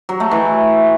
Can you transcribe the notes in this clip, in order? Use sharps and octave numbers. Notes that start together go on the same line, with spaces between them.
F#3
A3
E3